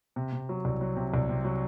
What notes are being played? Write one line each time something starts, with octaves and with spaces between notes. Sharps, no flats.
C3
C3
F#3
C2
F#3
C3
C2
C3
F#3